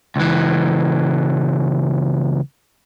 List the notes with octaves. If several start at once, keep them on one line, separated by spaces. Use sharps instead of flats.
C#2 E3